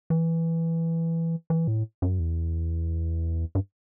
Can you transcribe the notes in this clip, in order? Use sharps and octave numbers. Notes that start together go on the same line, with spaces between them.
E3
E3
A2
F#2
E2
G2